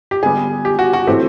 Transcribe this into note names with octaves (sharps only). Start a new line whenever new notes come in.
G4
D3 G3 B3 G#4
G4
F#4
F#4
A2 E3 A3 C4 G4